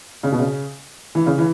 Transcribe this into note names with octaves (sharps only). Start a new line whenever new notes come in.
C#3
B2
C#3
E3
C#3
E3